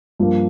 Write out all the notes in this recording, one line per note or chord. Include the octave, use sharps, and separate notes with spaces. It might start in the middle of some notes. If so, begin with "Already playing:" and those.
G2 F3 A#3